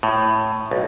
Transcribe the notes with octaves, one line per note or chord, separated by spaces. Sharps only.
A2
B1